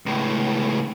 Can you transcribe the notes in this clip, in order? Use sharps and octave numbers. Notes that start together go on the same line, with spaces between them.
C#2 A2